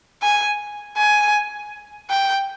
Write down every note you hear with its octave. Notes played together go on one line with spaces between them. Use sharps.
G#5
G#5
G5